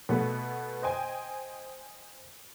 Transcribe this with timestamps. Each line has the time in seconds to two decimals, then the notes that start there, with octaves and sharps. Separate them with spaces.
0.09 B2 A3 B3
0.82 C5 D#5 G5 G#5